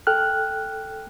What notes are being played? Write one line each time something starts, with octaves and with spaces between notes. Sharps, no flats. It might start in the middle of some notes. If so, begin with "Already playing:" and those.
A4 G5 F6 F#6